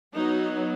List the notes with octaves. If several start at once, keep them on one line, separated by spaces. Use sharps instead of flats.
F#3 B3 D#4